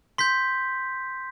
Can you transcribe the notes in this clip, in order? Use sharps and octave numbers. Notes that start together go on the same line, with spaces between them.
C6 G6 B6